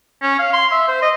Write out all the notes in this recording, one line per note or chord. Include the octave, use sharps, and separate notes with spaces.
C#4
F5
C6
E5
C5
D#5